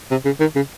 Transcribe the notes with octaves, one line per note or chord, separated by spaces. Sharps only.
C3
C#3
D#3
C#3